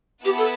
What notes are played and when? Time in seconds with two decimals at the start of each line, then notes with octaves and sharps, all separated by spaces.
0.24 B3 E4 G4 B4 F#5 A5
0.38 A4